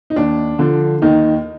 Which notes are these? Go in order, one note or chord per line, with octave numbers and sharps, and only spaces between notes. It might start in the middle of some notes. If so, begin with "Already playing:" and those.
D#4
D#2 D4
D3 F3
D#2 D#3 D#4